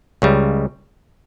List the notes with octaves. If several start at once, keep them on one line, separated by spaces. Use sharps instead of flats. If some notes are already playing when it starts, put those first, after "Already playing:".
C#2 C#3 G3